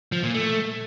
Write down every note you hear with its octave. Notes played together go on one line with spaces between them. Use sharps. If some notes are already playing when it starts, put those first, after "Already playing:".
F3
A#2
A3